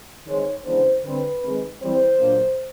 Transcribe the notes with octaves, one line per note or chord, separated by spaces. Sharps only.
D#3 G#3 C4 C#5
C#3 E3 G#3 B3 D4 C5
D3 G3 C4 B4
C3 D#3 G#3
E3 G3 C4 C5
A#2 F#3 A#3 D4